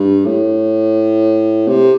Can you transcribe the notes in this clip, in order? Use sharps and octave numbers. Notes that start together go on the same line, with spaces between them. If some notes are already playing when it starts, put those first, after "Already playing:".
Already playing: G2
A2
C3